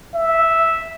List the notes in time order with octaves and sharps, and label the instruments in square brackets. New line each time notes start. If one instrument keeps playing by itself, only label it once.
[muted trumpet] E5